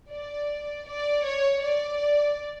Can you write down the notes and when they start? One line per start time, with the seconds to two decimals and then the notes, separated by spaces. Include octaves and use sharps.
0.11 D5
0.87 D5
1.25 C#5
1.62 D5